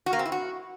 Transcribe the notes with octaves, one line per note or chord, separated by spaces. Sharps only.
F#4
A#3
C4
E4
F#4